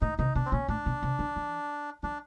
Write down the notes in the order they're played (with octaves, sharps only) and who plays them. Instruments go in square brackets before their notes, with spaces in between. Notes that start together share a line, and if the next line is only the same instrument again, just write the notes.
[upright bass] A2 [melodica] D#4
[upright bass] C3 [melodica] D#4
[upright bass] B2 [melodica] D4
[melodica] C4
[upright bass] A#2 [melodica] C#4
[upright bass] A2 [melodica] D4
[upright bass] B2
C3
D3
E3
[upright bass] F3 [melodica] D4